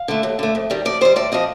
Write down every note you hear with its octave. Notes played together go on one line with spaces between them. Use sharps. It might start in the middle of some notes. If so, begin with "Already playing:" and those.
Already playing: F5
D3 A3
D#2
D3 A3
F2
D#3 G3
F2 D5
D#3 G3 C5
A2 D5
F3 C4 D#5